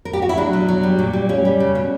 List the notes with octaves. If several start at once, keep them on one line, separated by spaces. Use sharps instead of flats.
A#4
G4
F#4
E4
F#3 D4
B2
F#3
G3
A#2
G3
G3 C#4
G3
C#3
B2